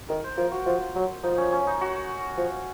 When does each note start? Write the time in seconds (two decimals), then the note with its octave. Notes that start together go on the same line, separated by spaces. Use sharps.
0.09 D#3 A#4
0.24 C5
0.37 F3 A#4
0.52 F#4
0.66 F3 F4
0.95 F#3
1.23 F3 D#4
1.38 C#4
1.52 C#4
1.67 D#4
1.81 F#4
2.38 F3